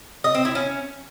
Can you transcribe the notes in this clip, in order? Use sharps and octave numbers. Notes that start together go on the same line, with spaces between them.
D#5
C4
E4
C#4